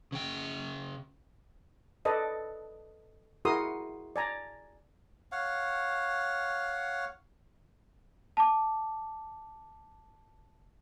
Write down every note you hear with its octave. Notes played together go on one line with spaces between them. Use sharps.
C#3 G5
A4 B4 D5 D#5
E4 F#4 G#4 A#4 C6 D#6
D5 G#5 A#5
C#5 F5 F#5
A5 D6